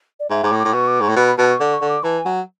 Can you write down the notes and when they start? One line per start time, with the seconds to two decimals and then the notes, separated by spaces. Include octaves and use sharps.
0.20 D5
0.30 G#2 E5
0.43 G#2 D6
0.52 A2
0.59 D6
0.65 A2
0.73 B2 C#6
0.87 D6
1.00 G#2 C#6
1.09 A2
1.16 B2 B5
1.27 B5
1.38 B2 A5
1.49 C#6
1.60 D3 D6
1.74 C#6
1.82 D3
1.89 D6
2.04 E3 A5
2.18 G#5
2.25 F#3